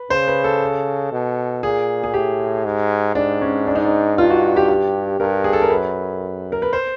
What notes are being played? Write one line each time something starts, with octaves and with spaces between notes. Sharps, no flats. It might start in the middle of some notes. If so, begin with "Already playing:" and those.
Already playing: B4
C#3 C5
B4
A4
B2
A#2 G#4
G#4
A2 G4
G#2
G#2 D4
C#4
D4
D#4
D4
G2 F4
F#4
G4
G4
G2 A#4
G#4
A4
A#4
F#2 B4
A#4
B4
C5